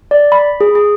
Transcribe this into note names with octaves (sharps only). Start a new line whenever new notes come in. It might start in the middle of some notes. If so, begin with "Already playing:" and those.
D5
B5
G#4
G#4